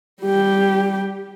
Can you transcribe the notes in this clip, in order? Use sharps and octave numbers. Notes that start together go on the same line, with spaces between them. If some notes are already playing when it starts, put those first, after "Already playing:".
G3 G4